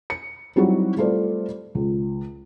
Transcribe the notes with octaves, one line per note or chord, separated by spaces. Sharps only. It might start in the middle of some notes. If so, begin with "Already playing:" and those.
C#7
F#3 G3 C4 D#4 E4 F#4
G3 A3 F4 A4 C5 D5
C#2